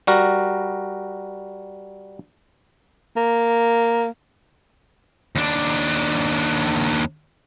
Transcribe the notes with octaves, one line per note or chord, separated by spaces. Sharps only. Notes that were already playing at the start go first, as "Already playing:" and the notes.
G3 F#4 A#4
A#3
D#2 D4